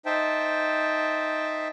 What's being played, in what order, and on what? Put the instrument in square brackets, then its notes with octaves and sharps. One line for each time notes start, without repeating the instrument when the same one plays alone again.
[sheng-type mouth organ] D#4 C5 E5 G5 A5